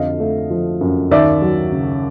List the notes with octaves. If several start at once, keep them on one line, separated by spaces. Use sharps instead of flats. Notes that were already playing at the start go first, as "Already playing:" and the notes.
Already playing: F2 D3 D#5 F5
A3
F3
F#2
D#2 D5 E5
F#3
C#3